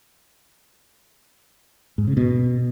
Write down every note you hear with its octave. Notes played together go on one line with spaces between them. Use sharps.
G#2
C#3
B2